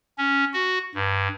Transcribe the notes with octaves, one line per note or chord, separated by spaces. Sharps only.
C#4
F#4
G2